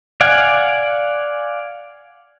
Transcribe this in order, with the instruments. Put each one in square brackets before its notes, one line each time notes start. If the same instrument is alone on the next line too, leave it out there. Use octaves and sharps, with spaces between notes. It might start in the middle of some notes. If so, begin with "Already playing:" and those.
[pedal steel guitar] D5 F5 F#5 G#5